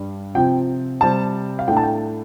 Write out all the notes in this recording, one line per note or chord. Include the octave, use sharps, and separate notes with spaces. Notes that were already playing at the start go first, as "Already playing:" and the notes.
Already playing: G2 G3 D4
C3 F3 C4 G5
C3 G3 C4 A5
F5
A2 A3 D4 G5
A5
G5